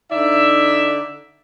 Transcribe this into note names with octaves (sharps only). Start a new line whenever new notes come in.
D3 D#4 D5 E5